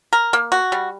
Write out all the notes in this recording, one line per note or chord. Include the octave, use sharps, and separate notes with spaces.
A#4
A#3
F#4
G3